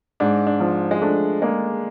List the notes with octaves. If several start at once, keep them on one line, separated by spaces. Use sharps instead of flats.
G#2 D4
D4
F3
G#3
A3 D4
G#3 A#3